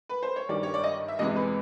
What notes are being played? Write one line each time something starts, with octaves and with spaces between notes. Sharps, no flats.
B4
C5
C#5
G2 D#3 G3 D5
C#5
D5
D#5
E5
E2 C3 E3 G#3 D#5
B4